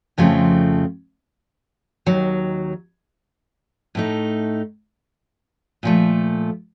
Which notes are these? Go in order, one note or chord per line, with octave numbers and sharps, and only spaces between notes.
F2 C#3 F3 A3 C4
D#2 D#3 F#3
A2 A3 D#4
A#2 F3 A3